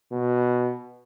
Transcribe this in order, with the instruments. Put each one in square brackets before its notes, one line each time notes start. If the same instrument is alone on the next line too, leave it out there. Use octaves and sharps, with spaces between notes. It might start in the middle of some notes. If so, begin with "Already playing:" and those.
[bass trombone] B2